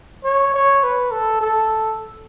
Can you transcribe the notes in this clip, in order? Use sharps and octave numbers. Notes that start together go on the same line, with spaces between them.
C#5
C#5
B4
A4
A4